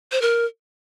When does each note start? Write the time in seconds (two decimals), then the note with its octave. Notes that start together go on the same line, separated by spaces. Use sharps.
0.12 C5
0.22 A#4